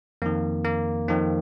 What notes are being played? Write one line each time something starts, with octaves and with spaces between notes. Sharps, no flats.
F2 D#3 A#3
A#3
F2 D#3 C4